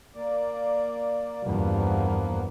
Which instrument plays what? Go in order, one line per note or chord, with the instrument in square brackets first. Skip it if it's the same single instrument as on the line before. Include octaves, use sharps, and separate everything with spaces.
[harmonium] A#3 D5
[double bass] E2 G2 [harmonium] F3 A#3 B3